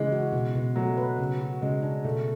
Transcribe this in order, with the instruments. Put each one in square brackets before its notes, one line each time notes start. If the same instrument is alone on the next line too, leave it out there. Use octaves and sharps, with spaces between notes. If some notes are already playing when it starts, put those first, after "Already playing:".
Already playing: [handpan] C#3 [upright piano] E3 G#3
[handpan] F#4
B2
B2
[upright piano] F#3 [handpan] A3
[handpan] B4
C#3
F#4
[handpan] C#3 [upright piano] G#3
[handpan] D4
[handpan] B2 [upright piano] A3